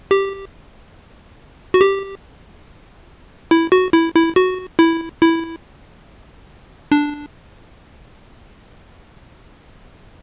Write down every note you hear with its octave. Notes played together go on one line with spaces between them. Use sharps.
G4
F#4
G4
E4
F#4
E4
E4
F#4
E4
E4
D4